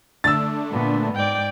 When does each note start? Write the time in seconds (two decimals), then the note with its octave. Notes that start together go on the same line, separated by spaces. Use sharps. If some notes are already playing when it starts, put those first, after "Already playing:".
0.24 D3 A3 D4 E6 A6
0.70 A#2 B3
1.15 G#2 D5 G5